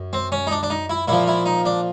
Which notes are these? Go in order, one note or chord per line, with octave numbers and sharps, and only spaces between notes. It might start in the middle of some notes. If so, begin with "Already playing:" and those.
Already playing: F#2
C4
C#4
D#4
D4
D4
D#4
E4
A#2 F3 E4
E4
D#4
D4